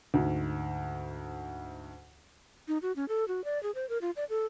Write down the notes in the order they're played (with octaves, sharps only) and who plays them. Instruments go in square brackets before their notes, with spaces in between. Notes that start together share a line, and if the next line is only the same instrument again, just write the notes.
[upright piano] D2 G#2
[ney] D#4
F#4
C#4
A4
F#4
D5
G#4
C5
A#4
F4
D5
A4